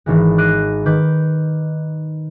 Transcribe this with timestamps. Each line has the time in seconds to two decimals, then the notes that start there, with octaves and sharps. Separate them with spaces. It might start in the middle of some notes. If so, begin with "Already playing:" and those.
0.06 G#1 E3 G#3
0.38 D6 F#6 A#6 C7 D7 D#7
0.86 D#3 B4 D6 G6